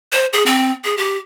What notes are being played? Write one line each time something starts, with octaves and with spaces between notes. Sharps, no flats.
C5
G#4
C4
G#4
G4